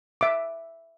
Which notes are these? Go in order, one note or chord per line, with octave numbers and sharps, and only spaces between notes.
E5 D6